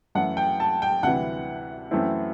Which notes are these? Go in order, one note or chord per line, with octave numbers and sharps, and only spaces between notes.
F#2 E3 A3 F#5
G5
A5
G5
D2 C3 E3 G3 F#5
F#2 E3 A3 C4 E4